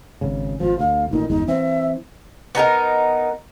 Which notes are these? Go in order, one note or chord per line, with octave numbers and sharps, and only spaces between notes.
G#1 C#3
G#1 F3 F4
D2 F5
A1 A#2 D#3 D#4
G1 E2 G#3 D#4
E3 C4 E5
B3 D#4 G4 A#4